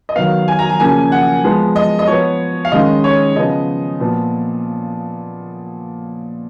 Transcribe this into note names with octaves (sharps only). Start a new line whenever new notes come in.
D#5
D#3 F#3 B3 F5
G#5
A#5
G#5
C#3 F3 A#3 G#5
F#5
F3 G#3 B3
D#5
D#5
F3 B3 C#5
F5
D#3 G#3 C#4 D#5
C#5
C#3 F3 B3 D#5
A#2 F3 B3